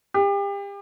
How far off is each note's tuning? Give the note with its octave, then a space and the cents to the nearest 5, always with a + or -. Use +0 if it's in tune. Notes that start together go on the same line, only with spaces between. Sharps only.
G4 +35